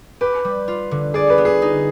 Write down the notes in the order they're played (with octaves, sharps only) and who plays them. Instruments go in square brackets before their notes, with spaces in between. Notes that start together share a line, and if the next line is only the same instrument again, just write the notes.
[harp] G4 [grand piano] B4
[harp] G3
F4
D3
[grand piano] G#4 [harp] D5
[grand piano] B4
[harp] B3
[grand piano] G#4
[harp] D#4